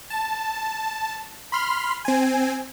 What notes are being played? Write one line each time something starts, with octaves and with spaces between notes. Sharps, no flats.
A5
B5 C6 F6
C4 G#5